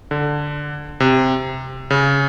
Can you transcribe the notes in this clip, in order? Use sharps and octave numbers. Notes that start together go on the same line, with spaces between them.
D3
C3
C#3